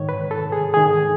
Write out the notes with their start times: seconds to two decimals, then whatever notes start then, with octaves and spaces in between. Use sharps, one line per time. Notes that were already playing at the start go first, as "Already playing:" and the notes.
Already playing: G#2 D#3 C#5
0.09 B4
0.31 A4
0.52 G#4
0.74 G#2 D#3 G#4